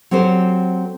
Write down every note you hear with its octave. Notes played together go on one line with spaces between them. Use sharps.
F#3 C4 G4 A4 C5